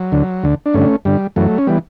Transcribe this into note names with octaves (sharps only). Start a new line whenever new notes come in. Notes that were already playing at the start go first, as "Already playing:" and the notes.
Already playing: F#3
D2 D3
D2 D3
D4
G2 D3 A3 C#4
G2 D3 G3
F#2 E3 F#3 A3
C#4
E3 G3 B3